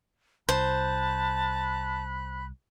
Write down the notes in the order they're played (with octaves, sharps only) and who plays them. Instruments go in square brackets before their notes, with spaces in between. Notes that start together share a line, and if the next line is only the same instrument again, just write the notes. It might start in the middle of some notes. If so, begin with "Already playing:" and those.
[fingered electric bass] C2 [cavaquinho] C5 [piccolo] A5 [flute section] B5 F#6